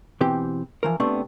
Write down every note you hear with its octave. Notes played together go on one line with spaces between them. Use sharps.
B2 E3 C4 G4
E3 F3 A#4
C3 A3 B3 C4 D4